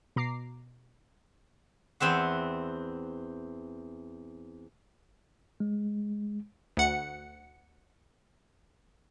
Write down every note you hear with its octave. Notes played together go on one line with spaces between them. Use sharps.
B2 A#5 D6 C7
E2 C4 E5 F#5
G#3
D2 F#5 C#7